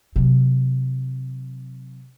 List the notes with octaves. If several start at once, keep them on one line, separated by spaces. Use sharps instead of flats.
C3 F#3